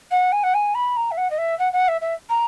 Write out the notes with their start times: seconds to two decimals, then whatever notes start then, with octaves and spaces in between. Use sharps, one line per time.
0.11 F#5
0.32 G#5
0.43 F#5
0.54 G#5
0.75 B5
0.96 A#5
1.11 E5
1.17 F#5
1.30 D#5
1.38 E5
1.59 F#5
1.73 F#5
1.88 E5
2.01 E5
2.30 A#5